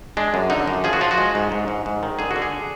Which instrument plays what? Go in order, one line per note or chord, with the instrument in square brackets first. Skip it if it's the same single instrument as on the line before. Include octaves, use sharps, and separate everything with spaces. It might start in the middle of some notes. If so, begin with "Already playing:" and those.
[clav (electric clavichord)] G#3 D4
F#2
D3 D#4
F#2
F3 G#4
F#4
F3 F4
F#4
G#3
G#2
G#2
G#2
G#2
D#3
D3 G#4
F#4
D3
G#4